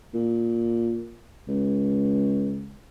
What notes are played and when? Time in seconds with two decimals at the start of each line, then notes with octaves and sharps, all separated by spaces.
0.14 A#2
1.48 C#2